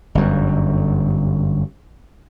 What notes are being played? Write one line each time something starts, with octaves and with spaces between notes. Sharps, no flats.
G1 F#2